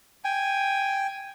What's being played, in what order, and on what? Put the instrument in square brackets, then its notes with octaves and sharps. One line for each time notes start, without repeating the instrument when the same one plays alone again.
[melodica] G5 G#5